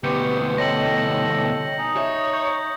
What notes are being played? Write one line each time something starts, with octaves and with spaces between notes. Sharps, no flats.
D2 B2 G4 B4 G6 C#7
C4
A4 C#5 D#5 G5 A#6 C#7 F#7
D#4 G#5 D#6
C#5 E5
C#6 G6